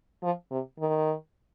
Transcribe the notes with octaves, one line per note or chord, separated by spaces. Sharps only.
F3
C3
D#3